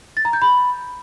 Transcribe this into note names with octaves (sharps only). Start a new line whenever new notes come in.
A6
A#5
G6
B5